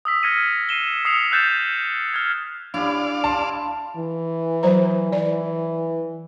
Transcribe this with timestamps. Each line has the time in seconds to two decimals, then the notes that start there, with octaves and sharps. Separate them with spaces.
0.05 D#6 E6 B6
0.23 F6 G#6 A#6 C#7 D#7
0.69 C7 D#7 E7 G7
1.05 D#6 E6 C7 C#7 F7
1.32 E6 F#6 G6 A6 E7
2.14 F6 G#6
2.74 G3 C#4 D4 E4 D5 F5
3.24 A5 C6
3.97 E3
4.63 F#3 C5 A#5
5.12 E3 D5